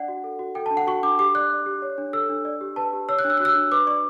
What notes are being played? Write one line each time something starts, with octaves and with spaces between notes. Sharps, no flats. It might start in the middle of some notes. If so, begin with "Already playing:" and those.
Already playing: D4 D5 F#5
F#4
A4
F#4
A4 G5
D4 A5
F#5
F#4 C#6
D4 D6
G4 D6
D5 F#6
D5
G4
C#5
D4
A4 E6
D4
D5
G4
B4 A5
G4
C#5 E6
F#6
D4
E6
F#4 F#6
E6
D4
B4 D6
D5 C#6